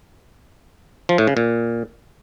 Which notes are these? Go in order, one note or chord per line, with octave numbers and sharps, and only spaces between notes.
F3
A2
C#3
A#2